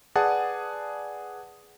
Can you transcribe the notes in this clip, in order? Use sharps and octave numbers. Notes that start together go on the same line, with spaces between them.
G#4 B4 D5 F#5 A5 D#6